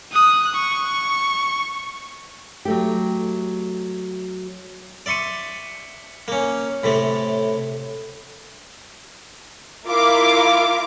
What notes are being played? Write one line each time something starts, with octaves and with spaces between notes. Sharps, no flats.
D#6 F#6
C#6
F#3 A3 G4
D5 E5 C6 C#6 D#6
A#3 C#4
A2 C3 A3
E4 F4 A#4 F5 D6